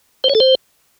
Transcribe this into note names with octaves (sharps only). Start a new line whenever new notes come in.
C5
C#5
A4
C5